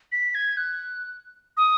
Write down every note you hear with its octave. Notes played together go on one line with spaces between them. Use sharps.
B6
G#6
F#6
D#6